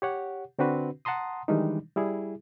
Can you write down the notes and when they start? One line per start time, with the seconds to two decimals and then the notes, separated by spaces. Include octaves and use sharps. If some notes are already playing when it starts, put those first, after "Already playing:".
0.02 G4 C#5 F#5
0.59 D3 C4 D4 F#4 B4
1.05 F#5 A5 A#5 C6 D#6
1.48 D#3 E3 G3 G#3 D4 D#4
1.96 G3 E4 G#4